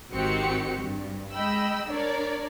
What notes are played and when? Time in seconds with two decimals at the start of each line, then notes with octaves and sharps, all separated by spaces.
0.12 G#1 D#3 C4 F#4 G4 C#7
0.81 G2
1.32 G#3 D#5 G5 B5 E6
1.90 D4 A#4 C#5 D5